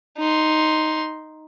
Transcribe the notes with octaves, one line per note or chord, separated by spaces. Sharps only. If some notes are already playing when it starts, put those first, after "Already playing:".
D#4 C6